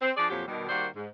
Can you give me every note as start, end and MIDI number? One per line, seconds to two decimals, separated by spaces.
0.02 0.11 60
0.17 0.26 53
0.17 0.26 62
0.17 0.26 68
0.17 0.26 74
0.30 0.43 41
0.30 0.43 46
0.30 0.43 53
0.30 0.43 54
0.30 0.43 67
0.48 0.66 47
0.48 0.66 51
0.48 0.66 55
0.69 0.87 51
0.69 0.87 55
0.69 0.87 58
0.69 0.87 66
0.69 0.87 72
0.69 0.87 74
0.96 1.08 44